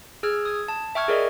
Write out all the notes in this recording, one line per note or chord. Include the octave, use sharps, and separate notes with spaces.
G#4 E6 F6 G#6
D#6 G#6
A5
E5 G5 C#6 F6 G#6
G#4 A#4 D5 D#5